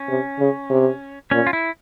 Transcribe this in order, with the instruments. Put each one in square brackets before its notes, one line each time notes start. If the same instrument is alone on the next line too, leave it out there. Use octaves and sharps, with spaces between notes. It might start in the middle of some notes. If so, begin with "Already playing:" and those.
Already playing: [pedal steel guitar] C#4
[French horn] C3
C#3
C3
[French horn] A#2 [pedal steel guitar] C#4
[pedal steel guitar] F4
E4